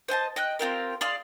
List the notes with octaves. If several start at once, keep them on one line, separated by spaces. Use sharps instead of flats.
C5 D#5 G#5 A5
D#5 G5 F#6
C4 F4 G4 A#4
G#4 D5 F5 C6